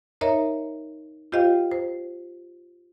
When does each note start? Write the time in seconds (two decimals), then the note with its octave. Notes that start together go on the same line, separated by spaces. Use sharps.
0.21 D#4 A#4 C#5 D#5 E5 A#5
1.32 F4 G4 C5 D#5 F5 G5
1.71 C5